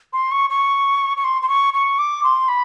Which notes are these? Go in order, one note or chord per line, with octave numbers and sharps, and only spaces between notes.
C6
C#6
C#6
C#6
C6
C6
C#6
C#6
D6
C6
B5